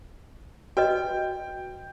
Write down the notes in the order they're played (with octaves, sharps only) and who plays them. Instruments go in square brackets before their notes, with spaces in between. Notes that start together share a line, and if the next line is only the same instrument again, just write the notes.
[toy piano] F#4 B4 D#5 [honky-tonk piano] G5